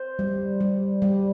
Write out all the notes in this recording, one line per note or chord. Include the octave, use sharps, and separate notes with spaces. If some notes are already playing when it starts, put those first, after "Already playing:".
Already playing: C5
G3
G3
G3